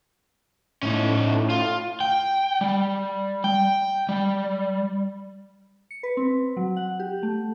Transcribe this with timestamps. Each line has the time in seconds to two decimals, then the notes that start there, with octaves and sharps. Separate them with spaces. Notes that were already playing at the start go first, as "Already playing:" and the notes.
0.83 A2 C#4 D#4
1.50 F4
2.00 G5
2.61 G3
3.44 G5
4.09 G3
5.91 C#7
6.03 B4
6.17 C4
6.57 F#3
6.77 F#5
7.00 G4
7.23 A3